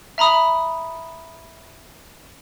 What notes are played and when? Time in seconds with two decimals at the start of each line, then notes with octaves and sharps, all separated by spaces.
0.18 E5 A#5 B5 D#6